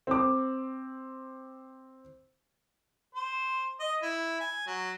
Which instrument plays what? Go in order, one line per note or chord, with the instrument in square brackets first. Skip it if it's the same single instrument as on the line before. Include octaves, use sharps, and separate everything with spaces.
[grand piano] C4 D6
[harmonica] C5
D#5
E4
G#5
F#3